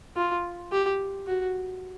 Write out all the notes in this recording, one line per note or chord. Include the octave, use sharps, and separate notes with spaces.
F4
G4
F#4